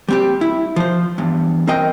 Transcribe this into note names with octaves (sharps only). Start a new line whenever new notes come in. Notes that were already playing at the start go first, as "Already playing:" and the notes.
G3 C4 G4
E4
F3 C5
E2 G2
C4 A#4 D#5 G5